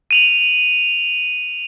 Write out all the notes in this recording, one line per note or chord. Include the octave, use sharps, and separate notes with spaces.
D#7 F7 F#7